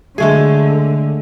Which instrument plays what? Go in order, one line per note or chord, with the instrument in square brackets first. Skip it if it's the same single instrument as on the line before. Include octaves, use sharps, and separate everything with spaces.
[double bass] D3 [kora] G#3 A3 G#4